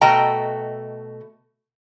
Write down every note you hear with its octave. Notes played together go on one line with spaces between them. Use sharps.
B2 A3 F#4 D#5 G5 A#5